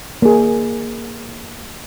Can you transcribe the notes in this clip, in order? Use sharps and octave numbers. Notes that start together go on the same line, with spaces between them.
A#3 G#4